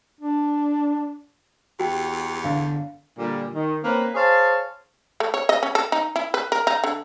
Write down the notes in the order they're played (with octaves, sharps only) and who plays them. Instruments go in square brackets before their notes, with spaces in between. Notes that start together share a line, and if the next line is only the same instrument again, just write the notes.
[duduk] D4
[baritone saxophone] E2 [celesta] F#4 G4 G5
[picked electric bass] G1 D3 [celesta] F5
[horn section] A#2 D3 G3
D#3
A#3 C4 C#4 A#4 B4
G#4 C5 C#5 F5 A5
[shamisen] A3
C#5
D#5
C#4
A4
D#4
E4
B4
A#4
D#4
D3